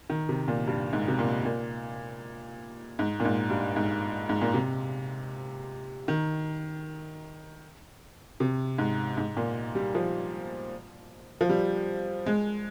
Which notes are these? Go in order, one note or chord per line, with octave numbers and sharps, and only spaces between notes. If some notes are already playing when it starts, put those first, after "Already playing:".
D#3
C3
A#2
G2
G#2
C3
A#2
A#2
G#2
A#2
G#2
G2
G#2
G#2
A#2
C3
D#3
C3
G#2
G#2
A#2
G3
F3
F3
G3
G#3